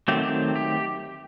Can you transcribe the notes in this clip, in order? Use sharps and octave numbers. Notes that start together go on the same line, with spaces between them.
D#3 F#3 A3 C4 G4
G4
G4